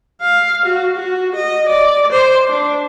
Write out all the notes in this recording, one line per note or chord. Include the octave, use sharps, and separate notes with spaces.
F5
F#4
F#4
D#5
D5
C5
D4